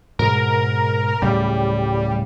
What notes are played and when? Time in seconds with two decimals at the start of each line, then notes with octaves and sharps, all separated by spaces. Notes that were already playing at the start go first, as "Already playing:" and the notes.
0.19 G#2 B2 G#3 A#4
1.22 D1 A2 C#3 G3